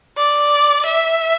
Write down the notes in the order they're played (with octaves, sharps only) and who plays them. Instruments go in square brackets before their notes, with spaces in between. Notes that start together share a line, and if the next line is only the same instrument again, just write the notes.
[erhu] D5
E5